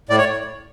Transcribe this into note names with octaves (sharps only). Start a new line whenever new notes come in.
A2 D5
C#5